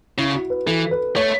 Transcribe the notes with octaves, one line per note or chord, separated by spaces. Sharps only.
C#3 E4
F#4
B4
E3 A4
B4
A3 C#5